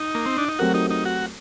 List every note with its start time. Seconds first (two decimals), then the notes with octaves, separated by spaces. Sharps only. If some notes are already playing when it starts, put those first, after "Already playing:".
Already playing: D#4
0.15 A#3
0.26 C4
0.38 D4
0.49 D#4
0.59 F#3 A3 C4 F#4 G4 A#4
0.74 D#4
0.90 D#4
1.05 F#4